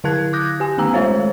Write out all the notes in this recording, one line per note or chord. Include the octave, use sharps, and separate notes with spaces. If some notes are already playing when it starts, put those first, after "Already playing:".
D3 E4 F5 A5 F#6 G#6
D6 D#6 F#6 G6 A#6
G4 G#5
D#3 A3 B3 A#5 E6
G#3 A3 F4 C5 C#5 F5